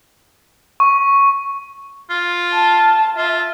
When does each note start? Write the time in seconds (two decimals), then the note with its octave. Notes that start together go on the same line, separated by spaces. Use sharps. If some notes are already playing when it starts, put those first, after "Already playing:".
0.80 C#6
2.10 F4
2.52 A5
3.17 F4 E5